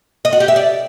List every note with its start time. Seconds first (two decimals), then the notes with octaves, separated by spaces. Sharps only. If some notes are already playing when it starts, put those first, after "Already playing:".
0.25 D#5
0.33 F#4
0.40 G4
0.48 E5
0.56 D5